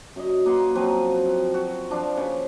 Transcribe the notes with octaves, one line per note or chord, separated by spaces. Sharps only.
F#2 D#5
A#3 B4 F#5 C6
F3 F#3 C4 B4
F#4
F3 D4 F5
C#3 B4